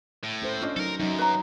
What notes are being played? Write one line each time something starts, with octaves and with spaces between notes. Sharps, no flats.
A2
C#4 A4 C5
C#4 D4 F4 D#5
F#3 D#4 A4 A#4
F#2 F#3 D#4
B4 A#5